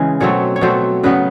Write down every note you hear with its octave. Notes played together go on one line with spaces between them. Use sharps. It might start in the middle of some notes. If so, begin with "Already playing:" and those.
Already playing: C#3 E3 G#3
B2 F#3 A3 C4 C#5
C#5
B2 F#3 A3 C4 C5
C#3 F#3 B3 B4